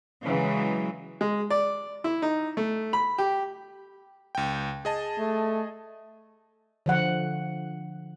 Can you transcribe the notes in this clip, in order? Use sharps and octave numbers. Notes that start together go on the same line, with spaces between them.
C#3 E3 F#3 G#3
G#3
D5
E4
D#4
A3
B5
G4
C#2 G5
G#4 D#5 A5
A3
D3 F3 F#5